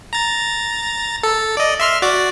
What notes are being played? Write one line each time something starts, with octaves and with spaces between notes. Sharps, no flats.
A#5 A6
A4
D5 D#5
E5 C6 F6
F#4 D5 D6